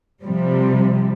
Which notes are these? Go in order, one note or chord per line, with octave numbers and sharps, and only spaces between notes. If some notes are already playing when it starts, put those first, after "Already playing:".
C3 F3 G3